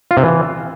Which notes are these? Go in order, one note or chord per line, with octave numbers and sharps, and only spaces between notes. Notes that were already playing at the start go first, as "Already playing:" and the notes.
F4
C3
E3